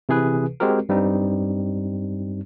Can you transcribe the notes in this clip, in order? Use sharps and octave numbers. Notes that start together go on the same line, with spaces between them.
C3 E3 G#4 B4
G#3 C4 F#4 G4 A#4
G2 G3 C4 D#4